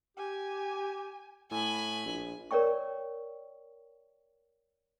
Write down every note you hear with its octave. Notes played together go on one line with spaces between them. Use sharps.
G4 G#5
A2 G#5 B5
A#1
A#4 C#5 D5 G5 C#6